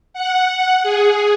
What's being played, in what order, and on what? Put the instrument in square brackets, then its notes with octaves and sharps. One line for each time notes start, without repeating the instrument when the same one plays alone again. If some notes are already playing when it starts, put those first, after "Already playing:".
[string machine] F#5
G#4